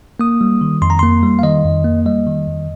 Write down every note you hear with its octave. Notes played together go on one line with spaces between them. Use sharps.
A#3 D#6
G3
D#3
F2 C6
A#5
A#3 C6
G3
F5
D#3 D#5
F2
A#3
G3 D#5
D#3
F2